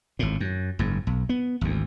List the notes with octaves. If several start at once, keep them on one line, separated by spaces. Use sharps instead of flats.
G#1 A2
F#2
F#1 G#2
B1
B3
G#1 D2